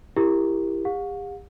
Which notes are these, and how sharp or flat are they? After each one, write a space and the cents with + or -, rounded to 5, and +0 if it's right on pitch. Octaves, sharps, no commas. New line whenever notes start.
E4 +15 G4 +15 A#4 +0
G4 +40 F#5 -45